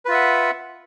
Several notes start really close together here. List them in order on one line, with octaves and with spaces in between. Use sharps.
B4 F4 E5 F#5